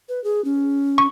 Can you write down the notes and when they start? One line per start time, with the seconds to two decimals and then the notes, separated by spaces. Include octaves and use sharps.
0.09 B4
0.24 G#4
0.45 C#4
0.98 C#6